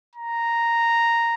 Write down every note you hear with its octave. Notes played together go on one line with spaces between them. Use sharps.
A#5